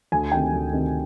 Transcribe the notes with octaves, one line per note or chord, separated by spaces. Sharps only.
D2 G#5
C3 D#3 G5
D2
C3 D#3